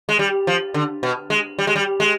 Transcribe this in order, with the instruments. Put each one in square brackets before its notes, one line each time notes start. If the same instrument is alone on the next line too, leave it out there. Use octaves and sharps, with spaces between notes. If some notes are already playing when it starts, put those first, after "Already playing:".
[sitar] G#3
G3
F3
D3
B2
G#3
G3
G#3
G3
G#3